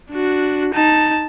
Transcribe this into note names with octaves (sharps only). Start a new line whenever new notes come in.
D4 F#4
D#4 A5